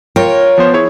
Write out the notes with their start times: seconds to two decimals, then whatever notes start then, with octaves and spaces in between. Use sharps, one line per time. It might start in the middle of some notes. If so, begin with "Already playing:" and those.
0.16 F4 A#4 C#5 G5
0.58 F3 B3 C5
0.74 E4 G#4 C#5